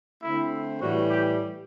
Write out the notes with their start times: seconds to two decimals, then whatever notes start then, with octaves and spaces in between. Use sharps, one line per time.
0.22 D3 A3 C4 E4
0.80 A2 E3 G3 F#4
1.09 G4